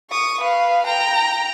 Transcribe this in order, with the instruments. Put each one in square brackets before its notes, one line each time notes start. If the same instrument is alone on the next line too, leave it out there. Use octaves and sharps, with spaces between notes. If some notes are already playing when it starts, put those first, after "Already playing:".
[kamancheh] C#6 D#6
B4 F5
G5 A#5